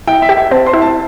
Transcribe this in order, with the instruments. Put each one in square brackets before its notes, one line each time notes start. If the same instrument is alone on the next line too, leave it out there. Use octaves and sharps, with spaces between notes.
[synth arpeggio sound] E4 [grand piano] G5
[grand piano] E5
[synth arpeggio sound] G4
[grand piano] E5
[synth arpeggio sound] C4 [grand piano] A5
[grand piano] C6
[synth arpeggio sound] E4
[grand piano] A5